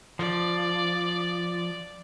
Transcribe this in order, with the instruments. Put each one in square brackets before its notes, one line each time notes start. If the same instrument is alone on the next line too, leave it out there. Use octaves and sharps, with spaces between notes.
[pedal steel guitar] F3 [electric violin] D5